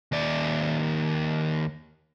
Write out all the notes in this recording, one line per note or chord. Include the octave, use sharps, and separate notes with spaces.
D#2 D5